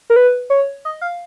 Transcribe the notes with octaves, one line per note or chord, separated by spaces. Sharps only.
A#4
B4
C#5
D#5
F5